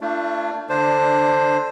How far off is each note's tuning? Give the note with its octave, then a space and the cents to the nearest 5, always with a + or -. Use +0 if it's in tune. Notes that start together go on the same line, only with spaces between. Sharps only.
A3 +30 D4 +5 F4 -30
D3 +0 D4 +15 C5 +5